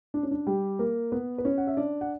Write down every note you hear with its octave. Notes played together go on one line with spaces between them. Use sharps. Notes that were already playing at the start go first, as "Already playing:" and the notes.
D4
C#4
D4
G3 G4
A#3 A#4
B3 B4
B4
C#4 C#5
F#5
E5
D4 D5
F#5